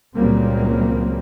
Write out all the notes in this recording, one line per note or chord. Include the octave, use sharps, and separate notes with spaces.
C#2 A#2 F#3 G3 A#3 C4